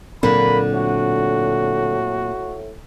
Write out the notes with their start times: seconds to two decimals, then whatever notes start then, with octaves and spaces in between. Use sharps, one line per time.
0.23 A#2 D3 F#3 A#3 C4 B5
0.72 A2 F#4